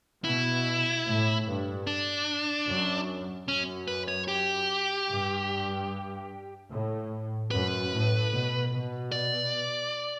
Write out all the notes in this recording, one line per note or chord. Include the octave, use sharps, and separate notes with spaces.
B2 E4
A2
G2
D4
F#2
F#2 C#4
B4
C#5
G4
G2
A2
F#2 B4
A2
B2
B2
D5